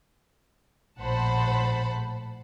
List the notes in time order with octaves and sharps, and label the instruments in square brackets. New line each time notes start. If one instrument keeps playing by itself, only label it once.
[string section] A#1 A2 C5 F#5 A5 B5